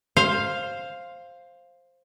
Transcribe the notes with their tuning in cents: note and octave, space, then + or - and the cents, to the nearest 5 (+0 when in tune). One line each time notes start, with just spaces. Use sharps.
C5 +10 F5 +0